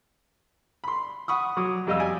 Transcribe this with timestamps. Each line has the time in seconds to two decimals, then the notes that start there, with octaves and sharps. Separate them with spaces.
0.84 B5 C6
1.28 F#5 B5 C#6 D#6
1.57 F#3 F#4 D6 D#6
1.87 F2 G3 D#5 F5 E6
1.99 G4 D5 G#5